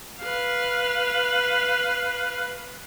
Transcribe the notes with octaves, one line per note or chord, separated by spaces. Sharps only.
B4 F5